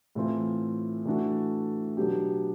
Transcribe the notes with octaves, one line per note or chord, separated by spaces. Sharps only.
A2 E3 A3 C4 F4
E3 A3 D4 F#4 A4
B2 F#3 B3 D4 G4